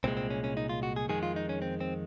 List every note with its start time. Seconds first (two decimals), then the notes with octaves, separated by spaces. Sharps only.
0.04 C2 A#2 G#3 C4
0.17 C4
0.30 C#4
0.44 C#4
0.57 D#4
0.69 F4
0.83 F#4
0.96 G#4
1.09 F2 D#3 G#3 G#4
1.23 F4
1.36 D#4
1.49 C#4
1.62 C4
1.81 C4